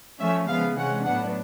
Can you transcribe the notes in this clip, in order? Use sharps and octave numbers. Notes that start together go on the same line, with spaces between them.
F3 A3 C#4 E5
C#3 F3 G#3 B3 F5
C3 E3 G#3 C#4 F#5
A2 F#3 B3 D4 F#5